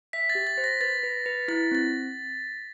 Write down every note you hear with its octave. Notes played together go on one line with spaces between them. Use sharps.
E5 B6
A6
G4
A6
C5
A#6
B4 A6
B4
B4
E4 A6
C4 A6